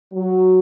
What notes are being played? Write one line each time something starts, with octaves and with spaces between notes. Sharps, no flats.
F#3